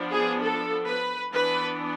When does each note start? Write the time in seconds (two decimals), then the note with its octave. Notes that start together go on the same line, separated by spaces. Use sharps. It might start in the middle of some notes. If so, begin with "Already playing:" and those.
Already playing: F3 B3 D4
0.10 G#4
0.40 A4
0.85 B4
1.31 E3 B3 D4 B4